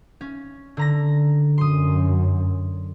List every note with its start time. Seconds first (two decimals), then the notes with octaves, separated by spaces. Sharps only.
0.21 C#4
0.77 D3 A#5 A#6
1.58 F#2 C6 D#6